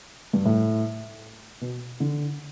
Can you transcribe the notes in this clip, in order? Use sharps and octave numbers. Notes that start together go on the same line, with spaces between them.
G2
A2
B2
D3